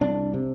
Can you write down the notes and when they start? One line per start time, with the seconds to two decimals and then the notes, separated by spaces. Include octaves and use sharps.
0.01 C2 D4
0.34 C3